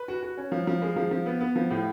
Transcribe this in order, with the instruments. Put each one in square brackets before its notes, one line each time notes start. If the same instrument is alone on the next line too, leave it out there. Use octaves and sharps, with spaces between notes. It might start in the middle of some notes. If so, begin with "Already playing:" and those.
Already playing: [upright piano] B4
F#4
F#4
C#4
F3
F3
G#3
F3
F3
B3
B3
F3
A2